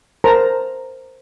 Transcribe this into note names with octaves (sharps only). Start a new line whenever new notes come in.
A#4 C5 A5 A#5